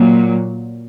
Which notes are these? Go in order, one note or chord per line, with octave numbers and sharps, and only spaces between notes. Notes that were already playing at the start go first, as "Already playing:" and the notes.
Already playing: A#2 F#3